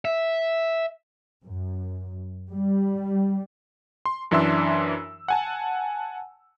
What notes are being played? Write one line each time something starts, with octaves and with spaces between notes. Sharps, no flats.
E5
F#2
G3
C6
F#2 E3 D4 E5 C6 E6
F#5 G#5 A5